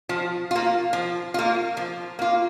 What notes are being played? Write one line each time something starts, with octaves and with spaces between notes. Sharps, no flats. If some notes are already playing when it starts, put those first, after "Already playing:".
F3
A#3 F4
F3
A#3 F4
F3
A#3 F4